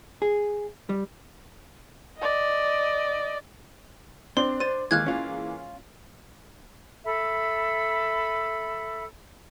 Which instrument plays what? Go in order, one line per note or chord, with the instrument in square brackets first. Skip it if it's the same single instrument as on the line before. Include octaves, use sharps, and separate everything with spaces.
[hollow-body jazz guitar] G#4
G3
[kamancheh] D5 D#5
[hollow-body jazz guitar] C4 [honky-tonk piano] D4 [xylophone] C6
[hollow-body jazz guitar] C5 [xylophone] A6 D#7
[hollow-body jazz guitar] D#2 [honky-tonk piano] E3 G#3 A#3 [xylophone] F6 F#6 G#6
[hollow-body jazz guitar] C#4 F4
[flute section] A4 E5 B5